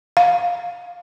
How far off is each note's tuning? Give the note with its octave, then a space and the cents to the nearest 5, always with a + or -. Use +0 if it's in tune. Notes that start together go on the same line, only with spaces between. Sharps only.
F5 +15